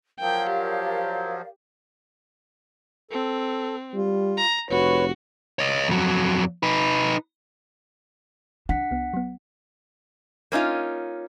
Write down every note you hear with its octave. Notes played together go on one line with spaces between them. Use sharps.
F3 F#3 A#4 D5 F5 G5
G4
C4 A4
G3 F4
A#5
F1 F#4 B4 C#5
C#5 D#5
F2 F#3
D#4 B4
D4 F#5 B6 C#7
C2 B3
F#3 B3
A#3 C#4 D#4 F4